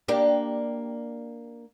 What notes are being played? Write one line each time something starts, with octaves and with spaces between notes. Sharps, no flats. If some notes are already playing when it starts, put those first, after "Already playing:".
A#3 D4 G4